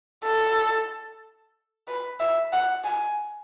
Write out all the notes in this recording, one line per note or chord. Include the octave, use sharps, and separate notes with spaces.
A4
B4
E5
F#5
G#5